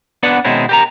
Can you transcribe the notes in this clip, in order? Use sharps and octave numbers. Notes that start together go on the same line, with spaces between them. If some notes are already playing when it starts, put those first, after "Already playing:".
B3 D4 B4 D5 F#5
B2 D#3 G#3 C4 C#4 E4
G4 A#4 A#5